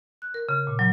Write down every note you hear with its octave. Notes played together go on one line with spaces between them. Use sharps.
F#6
A#4
C#3
A#2
F#3